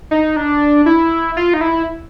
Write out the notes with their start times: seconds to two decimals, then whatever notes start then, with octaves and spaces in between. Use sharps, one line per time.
0.11 D#4
0.36 D4
0.86 E4
1.37 F4
1.54 D#4
1.61 E4